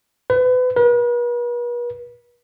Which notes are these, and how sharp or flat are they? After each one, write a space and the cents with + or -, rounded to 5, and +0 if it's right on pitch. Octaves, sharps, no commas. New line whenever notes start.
B4 +30
B4 -45